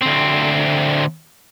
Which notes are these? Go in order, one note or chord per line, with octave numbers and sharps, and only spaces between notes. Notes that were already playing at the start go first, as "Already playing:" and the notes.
D2 C4